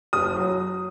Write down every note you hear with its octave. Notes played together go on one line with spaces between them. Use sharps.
F#1 D#6
F#3